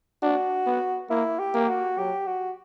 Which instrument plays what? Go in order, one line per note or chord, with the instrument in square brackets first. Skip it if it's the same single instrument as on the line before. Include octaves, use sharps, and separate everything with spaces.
[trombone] D4 [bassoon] F#4
[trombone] B3
[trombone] A#3 [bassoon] E4
[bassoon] G4
[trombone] A#3
[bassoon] F#4
[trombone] F#3 [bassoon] G4
[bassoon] F#4